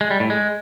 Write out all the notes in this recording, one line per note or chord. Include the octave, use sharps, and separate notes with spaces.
G#3
G3
A2
G#3